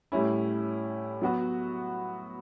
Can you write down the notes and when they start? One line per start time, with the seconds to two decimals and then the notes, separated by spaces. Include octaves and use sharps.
0.12 A2 G3 C#4 E4
1.21 F#3 B3 F#4